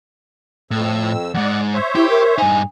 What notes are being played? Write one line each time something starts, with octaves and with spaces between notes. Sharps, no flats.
F2 A2 E6
F2 G#2 D5 F#5
C5 C#5 E5
E4 G4
A#4
G2 D#4 G#5